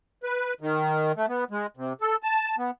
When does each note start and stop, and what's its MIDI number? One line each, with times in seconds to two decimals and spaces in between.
0.23 0.54 71
0.61 1.12 51
1.17 1.26 57
1.29 1.44 59
1.51 1.67 56
1.77 1.93 48
2.01 2.16 69
2.23 2.56 81
2.58 2.71 59